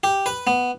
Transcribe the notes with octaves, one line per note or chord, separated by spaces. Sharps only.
G4
B4
B3